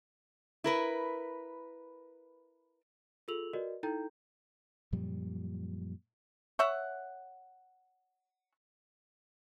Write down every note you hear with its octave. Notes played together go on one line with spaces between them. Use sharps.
E4 A#4 B4
F4 G#4 A4 E6 F7 F#7
F#4 A#4 B4 D5 D#5
D#4 E4 A4 G5 A#5 G6
F#2 A#2 F3 G3
C#5 E5 F#5